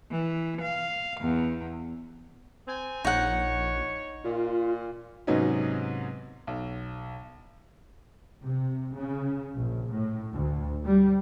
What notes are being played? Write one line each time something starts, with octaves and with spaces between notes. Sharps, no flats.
E3
F5
E2
C4 G#5
A#1 D#4 C#5 F#5
A#2 F4
G#2 C3 F#3 B3 C#4 D#4
B1
C3
C#3
A#1
A2
D2
G3